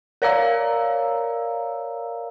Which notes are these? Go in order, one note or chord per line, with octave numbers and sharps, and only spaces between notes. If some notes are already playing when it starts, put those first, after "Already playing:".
A#4 C#5 D5 F5 A#5 E6